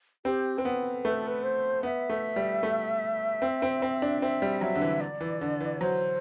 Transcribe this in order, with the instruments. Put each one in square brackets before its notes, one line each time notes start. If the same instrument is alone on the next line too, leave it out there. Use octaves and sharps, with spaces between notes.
[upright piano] C4 [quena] G4
[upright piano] C4 [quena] B4
[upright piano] B3 [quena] A4
[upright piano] A3 [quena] B4
[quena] A4
B4
C5
[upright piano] B3 [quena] E5
[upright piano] A3
G3
A3
C4
C4
C4
D4
[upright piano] C4 [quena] E5
[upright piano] G3
[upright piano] F#3 [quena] E5
[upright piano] D3
E3
[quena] D5
[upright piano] E3
D3
E3
[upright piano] F#3 [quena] C5